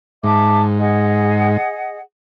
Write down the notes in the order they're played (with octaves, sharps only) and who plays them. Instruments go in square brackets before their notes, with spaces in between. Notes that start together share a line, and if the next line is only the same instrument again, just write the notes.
[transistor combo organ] G#2 [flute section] E5 A5 D6
[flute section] G#4 D#5 F#5